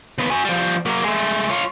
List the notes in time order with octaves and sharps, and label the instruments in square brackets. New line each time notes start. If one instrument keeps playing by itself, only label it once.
[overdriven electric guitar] D#2 B3
F#4 G#5
F3 G3
F#3 A#3
G#3 A3
F4 C#5